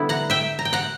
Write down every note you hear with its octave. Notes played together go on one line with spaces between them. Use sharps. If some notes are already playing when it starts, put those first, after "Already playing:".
Already playing: D3 G3 B3 E4
F#5 A#5
E5 G5
A#5
G5
F#5 A#5